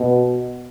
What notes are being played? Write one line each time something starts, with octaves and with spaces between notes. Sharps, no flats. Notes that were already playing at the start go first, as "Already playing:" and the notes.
Already playing: B2